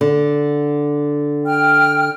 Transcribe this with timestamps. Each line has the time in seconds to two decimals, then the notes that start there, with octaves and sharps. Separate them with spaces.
0.01 D3
1.46 G5 F6